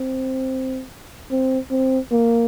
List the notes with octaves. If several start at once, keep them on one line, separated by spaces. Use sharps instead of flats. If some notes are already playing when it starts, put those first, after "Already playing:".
Already playing: C4
C4
C4
A#3